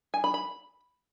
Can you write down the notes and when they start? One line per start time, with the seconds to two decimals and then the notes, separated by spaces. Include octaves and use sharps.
0.14 G#5
0.24 B5
0.34 B5